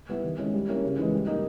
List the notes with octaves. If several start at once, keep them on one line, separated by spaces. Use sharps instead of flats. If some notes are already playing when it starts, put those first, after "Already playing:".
G3 B3 E4
D#3
G#3 C#4 E4
G3
A#3 C#4 E4
C#3
E3 G#3
G3
A#3 D#4